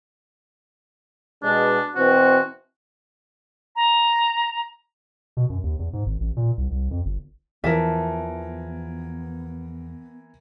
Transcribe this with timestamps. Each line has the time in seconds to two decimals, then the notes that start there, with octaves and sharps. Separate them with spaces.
1.43 B2 G#3 D4
1.95 B2 E3 C4 F#4
3.76 A#5
5.37 B2
5.50 F#2
5.64 D#2
5.79 E2
5.93 G#2
6.06 G#1
6.20 A1
6.37 A#2
6.58 C2
6.71 C2
6.91 F2
7.05 G1
7.64 E2 E3 F3 B3 A#4 E5 A5